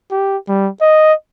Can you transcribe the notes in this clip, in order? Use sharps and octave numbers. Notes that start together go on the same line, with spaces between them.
G4
G3
D#5